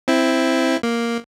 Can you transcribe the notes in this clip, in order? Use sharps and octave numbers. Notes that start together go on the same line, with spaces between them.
C4 E4
A#3